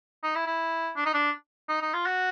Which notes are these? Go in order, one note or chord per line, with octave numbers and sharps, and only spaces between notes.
D#4
E4
E4
D4
D#4
D4
D#4
D#4
F4
F#4